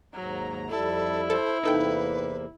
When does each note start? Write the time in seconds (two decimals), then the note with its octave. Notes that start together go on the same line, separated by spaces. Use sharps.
0.15 D#2 G#2 F#3 A#5
0.70 F2 G3 E4 A4
1.30 A4 C5
1.63 E2 C3 A#3 D#4 A4 B4 G5